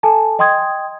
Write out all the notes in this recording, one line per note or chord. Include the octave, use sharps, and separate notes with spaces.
A4 G#5 A5
D#5 G5 C6 D#6 G#6